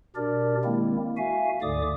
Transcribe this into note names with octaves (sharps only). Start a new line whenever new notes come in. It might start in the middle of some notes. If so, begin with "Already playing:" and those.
B2 D4 G4 A#4 D5
D#3 G#3 A#3 C4 E4
F#4 E5 F5 G#5
D2 G#2 D3 D5 D6 D#6